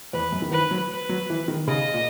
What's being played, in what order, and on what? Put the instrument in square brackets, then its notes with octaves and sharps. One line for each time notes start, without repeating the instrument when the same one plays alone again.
[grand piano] E2 [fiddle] B4
[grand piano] F#2
D#3
[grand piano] E3 [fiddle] B4
[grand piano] F#3
[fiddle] B4
[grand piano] F#3
E3
D#3
[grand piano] C#3 [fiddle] D#5
[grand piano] A#2